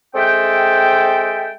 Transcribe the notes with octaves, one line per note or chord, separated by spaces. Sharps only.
G#3 C4 A4 E5 G5